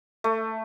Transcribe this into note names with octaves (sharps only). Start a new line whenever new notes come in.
A3